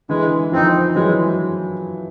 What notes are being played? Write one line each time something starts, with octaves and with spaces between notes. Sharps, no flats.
D3 E3 G#3
D#3 F3 C4 D#4
E3 F#3 G#3